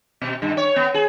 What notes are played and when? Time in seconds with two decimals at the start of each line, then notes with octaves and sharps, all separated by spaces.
0.22 B2
0.42 G2
0.57 C#5
0.76 B3
0.94 G#4